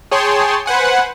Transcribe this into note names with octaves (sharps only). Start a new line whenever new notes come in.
G#4 C#5 G5 A5 C6
B4 C5 F#5 G#5